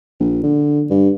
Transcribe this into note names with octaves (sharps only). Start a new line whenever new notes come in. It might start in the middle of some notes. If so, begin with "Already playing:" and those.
A#1
D3
G2